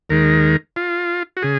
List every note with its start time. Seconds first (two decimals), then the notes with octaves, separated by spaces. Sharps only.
0.10 D#2 D#3 G#3 A#4
0.76 F4
1.37 F#4
1.42 C#3 G#4